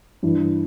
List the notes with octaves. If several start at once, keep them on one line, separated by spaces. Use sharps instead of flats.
G2 E3